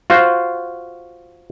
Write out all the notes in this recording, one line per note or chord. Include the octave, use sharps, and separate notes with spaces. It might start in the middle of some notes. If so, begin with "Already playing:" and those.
F4 F#4 C5